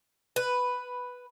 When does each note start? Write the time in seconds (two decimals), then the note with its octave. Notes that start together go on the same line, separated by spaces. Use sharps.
0.36 B4